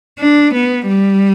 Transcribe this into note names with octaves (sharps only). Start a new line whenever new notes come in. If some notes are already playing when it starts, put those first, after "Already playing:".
D4
B3
G3